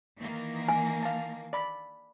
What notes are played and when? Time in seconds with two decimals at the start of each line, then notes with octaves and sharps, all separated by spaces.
0.18 D#3 E3 A#3
0.68 G#5
1.03 F5 A5
1.53 D5 B5